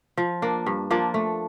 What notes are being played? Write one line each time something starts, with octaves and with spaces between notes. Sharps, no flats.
F3
A#3 D4
G2
F3 A#3 D4
A3